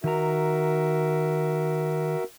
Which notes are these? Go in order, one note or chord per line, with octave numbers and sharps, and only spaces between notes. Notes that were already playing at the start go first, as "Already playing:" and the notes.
D#3 F#4 A#4 E5 A#5